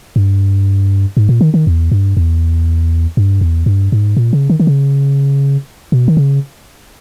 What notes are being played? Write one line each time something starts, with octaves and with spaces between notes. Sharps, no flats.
G2
G#2
A#2
D#3
D#3
E2
G2
E2
G2
E2
G2
G#2
A#2
C#3
D#3
D#3
C#3
B2
D#3
C#3